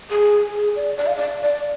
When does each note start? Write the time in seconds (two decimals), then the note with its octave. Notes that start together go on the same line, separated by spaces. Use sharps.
0.10 G#4
0.54 G#4
0.76 D5
0.97 D5
1.07 F5
1.17 D5
1.42 D5